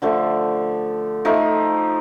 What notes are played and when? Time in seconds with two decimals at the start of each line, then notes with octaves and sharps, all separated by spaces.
0.02 D3 F3 A3
1.25 F3 A3 D#4